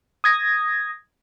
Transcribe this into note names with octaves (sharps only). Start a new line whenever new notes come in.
D#6 G#6 A#6